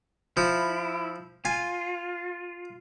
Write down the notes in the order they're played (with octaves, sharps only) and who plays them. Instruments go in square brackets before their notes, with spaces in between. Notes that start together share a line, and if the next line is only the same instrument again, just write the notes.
[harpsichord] F3 [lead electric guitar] E4
[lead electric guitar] F4 [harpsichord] G#5